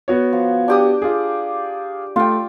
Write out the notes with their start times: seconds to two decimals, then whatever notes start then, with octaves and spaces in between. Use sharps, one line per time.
0.08 B3 F#4 C#5
0.33 F3
0.68 D4 G4 D#6
1.02 F4 G#4
2.16 A3 F4 G5